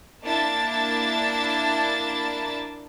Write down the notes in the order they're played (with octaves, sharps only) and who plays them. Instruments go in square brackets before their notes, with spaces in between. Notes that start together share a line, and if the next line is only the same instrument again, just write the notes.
[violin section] A#3 D4 E4 A5 A6